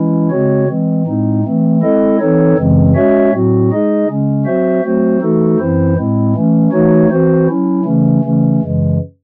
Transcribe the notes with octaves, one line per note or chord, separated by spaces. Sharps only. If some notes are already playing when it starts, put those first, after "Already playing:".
Already playing: E3 G#3 C#4 E4
C#3 G#3 C4 F#4 C#5
E3 G#3 C4
A2 G#3 C4 D#4
E3 A3 C4
G#3 C4 E4 A4 D#5
E3 C4 D#4 A4 C#5
F#2 C#3 E3 G#3 C4
G#3 C#4 F#4 C#5 E5
A2 F#3 C4 F#4
G#3 D#4 G#4 D#5
C#3 G#3 C#4
F#3 C4 F#4 C5 E5
F#3 A3 C4 F#4 C5
E3 A3 D#4 F#4 A4
F#2 E3 C4 E4 C5
A2 G#3 C4 E4
E3 A3 C#4
E3 A3 D#4 F#4 C#5
E3 C4 F#4 C5
F#3 C#4 E4
C#3 E3 A3 C#4
C#3 E3 A3 C#4
F#2 C#3 E3 G#3